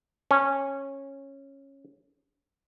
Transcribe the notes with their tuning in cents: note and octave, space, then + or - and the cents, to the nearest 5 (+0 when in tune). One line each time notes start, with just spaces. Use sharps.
C#4 -15